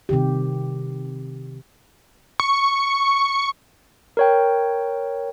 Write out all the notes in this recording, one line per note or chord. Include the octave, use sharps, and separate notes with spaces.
C3 D#3 G4
C#6
A#4 C#5 G5